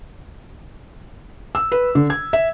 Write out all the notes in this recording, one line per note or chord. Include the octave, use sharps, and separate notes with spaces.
E6
B4
D3
G#6
E5